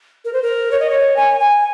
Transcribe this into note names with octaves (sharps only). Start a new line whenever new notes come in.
A#4
C5
A#4
C#5
D#5
C#5
G#5
G#5